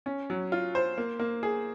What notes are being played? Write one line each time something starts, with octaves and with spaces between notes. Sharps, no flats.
C#4
F#3
F4
C5
A#3
A#3
G#4